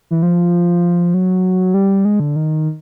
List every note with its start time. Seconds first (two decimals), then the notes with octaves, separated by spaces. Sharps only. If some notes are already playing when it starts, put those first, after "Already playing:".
0.11 E3
0.22 F3
1.14 F#3
1.74 G3
2.05 G#3
2.20 D3
2.36 D#3